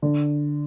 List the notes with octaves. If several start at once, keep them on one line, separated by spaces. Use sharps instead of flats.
D3